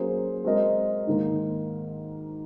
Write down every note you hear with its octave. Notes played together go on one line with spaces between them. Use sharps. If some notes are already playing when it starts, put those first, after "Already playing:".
Already playing: F#3 A#3 C#4 G#4 C5
G#3 C4 F#4 A#4 D#5
G#2 D#3 A#3